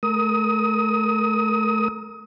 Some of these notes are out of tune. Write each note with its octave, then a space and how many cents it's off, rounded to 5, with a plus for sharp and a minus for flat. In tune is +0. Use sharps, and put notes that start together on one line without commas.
A3 -25 A#4 +0 D#6 +30